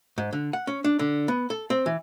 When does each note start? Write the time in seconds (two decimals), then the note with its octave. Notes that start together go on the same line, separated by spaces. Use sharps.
0.18 G#2
0.33 D3
0.53 F#5
0.67 C#4
0.84 D4
0.99 D3
1.28 B3
1.50 A4
1.70 C4
1.86 E3